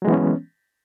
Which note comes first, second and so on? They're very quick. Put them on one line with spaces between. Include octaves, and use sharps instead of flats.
F#3 G#3 E3 B3 C#4